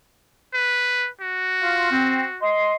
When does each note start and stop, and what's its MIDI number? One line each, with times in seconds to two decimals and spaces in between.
0.54 1.08 71
1.21 2.40 66
1.61 1.88 65
1.61 1.88 77
1.91 2.23 60
2.42 2.73 75
2.42 2.73 84